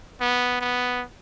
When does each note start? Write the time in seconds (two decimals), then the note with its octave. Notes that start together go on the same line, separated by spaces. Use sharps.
0.21 B3
0.61 B3